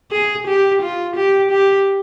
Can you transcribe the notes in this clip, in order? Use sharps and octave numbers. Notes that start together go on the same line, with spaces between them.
G#4
G4
F4
G4
G4